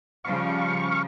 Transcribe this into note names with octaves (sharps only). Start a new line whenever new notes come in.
C#3 F3 G3 F5 C#6